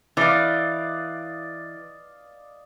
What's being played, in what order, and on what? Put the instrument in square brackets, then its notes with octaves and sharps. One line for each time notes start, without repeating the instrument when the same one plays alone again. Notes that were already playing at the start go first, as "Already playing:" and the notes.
[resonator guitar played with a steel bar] E3 [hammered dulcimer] D5 D#5 F5